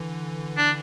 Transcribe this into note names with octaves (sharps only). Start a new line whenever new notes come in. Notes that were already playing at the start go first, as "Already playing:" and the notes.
Already playing: D3 E3
D4